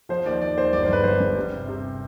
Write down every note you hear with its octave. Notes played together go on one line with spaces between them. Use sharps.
F3 C5
D#2 D5
D#2 D5
D#2 C5
G1 D5
C5
G1 B4
G1 C5
G2
G3
C3
C3